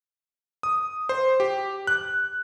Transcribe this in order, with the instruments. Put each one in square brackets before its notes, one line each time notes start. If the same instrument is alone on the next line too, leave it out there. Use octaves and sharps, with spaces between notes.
[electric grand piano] D#6
C5
G4
F#6